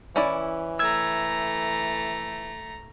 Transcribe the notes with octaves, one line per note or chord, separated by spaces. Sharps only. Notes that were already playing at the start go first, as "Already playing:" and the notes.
E3 C#4 E4 D5
A3 A#5 E6 G#6